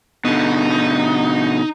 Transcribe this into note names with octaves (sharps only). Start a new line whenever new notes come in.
B2 D3 D#4